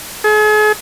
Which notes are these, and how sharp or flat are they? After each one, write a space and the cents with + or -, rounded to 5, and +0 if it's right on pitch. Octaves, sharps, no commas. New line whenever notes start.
G#4 +40